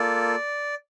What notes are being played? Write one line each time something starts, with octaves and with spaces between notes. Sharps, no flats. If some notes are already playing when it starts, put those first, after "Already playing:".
Already playing: A#3 F4 A4 D5